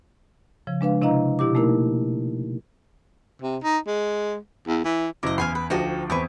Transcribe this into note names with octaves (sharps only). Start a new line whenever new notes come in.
C#3 F3
G#3 D4 B4 F5
C3 D4 E4 D#5 F5 A#5
B2 E4 G4 D6
A3 A#3 D#4 E4 A#4
C3
D#4
G#3
E2
E3
F#1 E4 A#4 D#5 D6
E2 F5 G#5 B5 C6
B4
D2 F3 D#4 F#4 G4
E2 C4 B4 C#6 D6